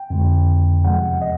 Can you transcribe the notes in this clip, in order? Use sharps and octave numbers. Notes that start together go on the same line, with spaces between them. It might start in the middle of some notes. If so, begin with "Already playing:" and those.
Already playing: G5
F2 D3 F3 G#3
E2 C3 F3 G#3 F#5
D#5